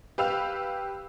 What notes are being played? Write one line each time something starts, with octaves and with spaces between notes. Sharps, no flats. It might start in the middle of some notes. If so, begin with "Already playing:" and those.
G4 B4 F5 E6 F7